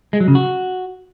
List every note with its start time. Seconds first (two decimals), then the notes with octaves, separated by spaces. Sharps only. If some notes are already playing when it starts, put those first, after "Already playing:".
0.13 G#3
0.20 F#3
0.28 C#3
0.35 F#4